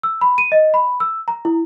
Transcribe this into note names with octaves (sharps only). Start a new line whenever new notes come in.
E6
B5
D#7
D#5
B5
E6
A#5
E4